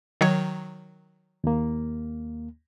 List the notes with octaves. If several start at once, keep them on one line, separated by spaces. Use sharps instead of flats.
D#3 F#3 C#5
D#2 A#3